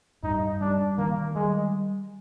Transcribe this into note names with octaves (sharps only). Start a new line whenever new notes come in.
G2 D#4
G3 D4
D#3 A#3
G3 G#3